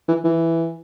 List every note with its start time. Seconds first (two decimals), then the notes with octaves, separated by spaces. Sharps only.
0.08 E3
0.24 E3